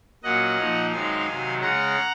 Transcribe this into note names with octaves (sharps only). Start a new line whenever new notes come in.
A#2 F#3 A#3 C#4 D#5 F#5
A#2 F3 A#3 D#4
F#2 D#3 G#3 C4 D#4 F5 G#5
C3 D#3 F#3
C#3 G#3 C#4 F#5 A#5